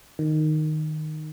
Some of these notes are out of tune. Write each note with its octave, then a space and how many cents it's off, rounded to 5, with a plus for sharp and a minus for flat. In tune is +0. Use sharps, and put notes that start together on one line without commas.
D#3 -10